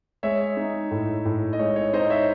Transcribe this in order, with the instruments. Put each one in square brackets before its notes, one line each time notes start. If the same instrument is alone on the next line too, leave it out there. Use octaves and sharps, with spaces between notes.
[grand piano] G#3 C#5 E5
D#4
A2
A2
D#5
G#3 C#5
C#5
D#4 C5 D#5
C#5 E5